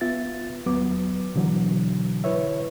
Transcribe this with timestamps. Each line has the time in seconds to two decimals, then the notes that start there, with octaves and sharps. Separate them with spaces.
0.01 B3 F4 E5 A6
0.66 D#2 F#3 B3 D6
1.35 B2 D3 E3 F#3
2.24 E4 B4 C#5 E5